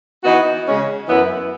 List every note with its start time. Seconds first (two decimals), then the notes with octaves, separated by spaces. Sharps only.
0.24 E3 B3 D#4 F#4
0.66 C#3 G#3 C#4
1.07 F#2 E3 B3 E4